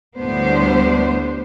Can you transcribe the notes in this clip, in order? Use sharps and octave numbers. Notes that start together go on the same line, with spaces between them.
D2 A2 G3 B3 D4 C5